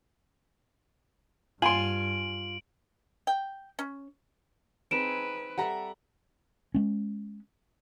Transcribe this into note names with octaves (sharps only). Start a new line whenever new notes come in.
G2 F4 G#5 C6 D7 F#7
G5
C#4
C4 D#4 G#4 B4 D7 E7
G3 A4 E5 F#5 A#5
G#3 C#4